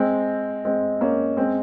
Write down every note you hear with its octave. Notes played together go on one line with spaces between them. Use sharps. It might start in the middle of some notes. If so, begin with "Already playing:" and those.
Already playing: G#3 C4
G#3 C4
A#3 C#4
G#3 C4